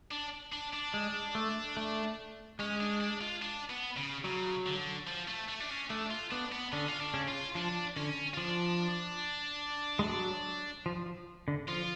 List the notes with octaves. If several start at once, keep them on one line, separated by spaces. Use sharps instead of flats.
D4
D4
D4
G#3
A3
A3
G#3 C#4
D4
D4
F4
D4
B3
C#3
C#3 F#3
D3
F3
A3
A3
D4
C#4
A3 D4
F4
B3 D4
B3
D3 C#4 D4
F4
D4
C#3 C#4
F4
F3 D4
D3 C#4
F4
F3 D4
G#3
F#3
F3
F3
D3
F3 F4